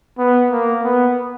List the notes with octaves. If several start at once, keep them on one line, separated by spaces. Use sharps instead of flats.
B3
A#3
B3